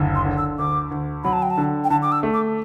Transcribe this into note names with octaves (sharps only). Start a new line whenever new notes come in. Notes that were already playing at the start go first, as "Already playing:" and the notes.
Already playing: F#1 D2
C6
D3
E6
D2 D6
D2
F#3 B5
A5
G5
A5
D3
G5
D3 A5
D6
E6
A3
D6